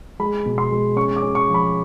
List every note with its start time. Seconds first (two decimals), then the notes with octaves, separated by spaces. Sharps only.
0.20 G#3 B5
0.46 B2
0.58 C6
0.72 G#3
0.96 C#4 C#6
1.16 D6
1.22 C#4
1.35 C#6
1.48 F3
1.54 B5